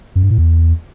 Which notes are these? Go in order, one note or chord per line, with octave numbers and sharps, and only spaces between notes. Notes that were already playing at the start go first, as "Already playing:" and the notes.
F#2
G2
A2
E2